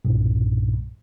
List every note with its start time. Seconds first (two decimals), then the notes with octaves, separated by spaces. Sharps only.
0.05 B1 G2 A#2